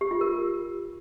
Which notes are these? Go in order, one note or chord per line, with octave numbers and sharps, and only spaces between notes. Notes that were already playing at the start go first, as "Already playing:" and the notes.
G4
F4
A#4